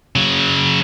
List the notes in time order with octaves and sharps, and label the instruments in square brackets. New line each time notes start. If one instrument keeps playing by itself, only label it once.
[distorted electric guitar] C#3 F#3